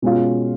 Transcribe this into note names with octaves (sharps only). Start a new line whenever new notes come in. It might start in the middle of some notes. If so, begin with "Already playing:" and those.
B2 G#3 C#4 F4